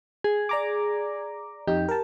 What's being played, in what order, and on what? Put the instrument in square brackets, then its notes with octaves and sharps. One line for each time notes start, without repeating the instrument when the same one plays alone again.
[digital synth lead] G#4
[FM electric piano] D5 A#5 D6
[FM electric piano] F2 D#4 [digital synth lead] G4
[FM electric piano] A#4 A5